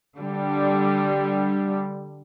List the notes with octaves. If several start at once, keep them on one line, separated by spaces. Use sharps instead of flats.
D3 G3